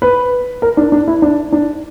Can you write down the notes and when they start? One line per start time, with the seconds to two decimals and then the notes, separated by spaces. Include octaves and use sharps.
0.02 B4
0.62 A#4
0.77 D4
0.92 D4
1.08 E4
1.22 D4
1.52 D4